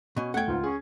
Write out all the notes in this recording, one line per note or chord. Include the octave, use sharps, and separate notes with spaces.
B2 C#4
E2 A3 F#5 G5 G#6
C#2 G#2 F4
C#4 G#4